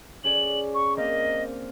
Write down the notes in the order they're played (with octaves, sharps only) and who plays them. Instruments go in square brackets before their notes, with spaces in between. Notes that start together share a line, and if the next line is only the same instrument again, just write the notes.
[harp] C#4 G#4 D5 [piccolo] F#7
[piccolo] C#6
[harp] A#3 C4 F5 [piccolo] D#5